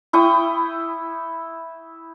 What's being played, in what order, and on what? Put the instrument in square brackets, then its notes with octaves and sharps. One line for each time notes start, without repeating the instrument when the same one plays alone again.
[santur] E4 G5 C#6 D#6